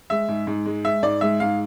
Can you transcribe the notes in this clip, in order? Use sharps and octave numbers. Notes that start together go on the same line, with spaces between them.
G#3 E5
G#2
G#2
G#3
G#3 E5
G#2 D5
G#3 E5
G#2 F5